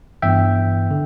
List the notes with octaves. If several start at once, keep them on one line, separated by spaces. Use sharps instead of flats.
G1 G2 E3 B3 E5 G5
D3